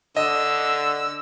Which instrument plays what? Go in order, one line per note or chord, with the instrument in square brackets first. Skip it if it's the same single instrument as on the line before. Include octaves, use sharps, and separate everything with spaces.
[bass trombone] D3 [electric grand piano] D#5 [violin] E6